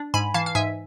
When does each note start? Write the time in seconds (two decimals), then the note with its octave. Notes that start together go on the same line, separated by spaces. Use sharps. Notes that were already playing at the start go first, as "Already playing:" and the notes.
Already playing: D4
0.14 G#2 G#5 B5
0.34 E3 F5 A5
0.46 F5
0.55 G#2 E5 G#5